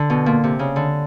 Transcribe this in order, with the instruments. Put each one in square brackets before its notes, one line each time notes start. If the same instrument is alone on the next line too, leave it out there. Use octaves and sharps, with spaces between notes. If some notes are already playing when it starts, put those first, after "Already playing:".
Already playing: [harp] D3
B2
A#2
C3
C#3
D3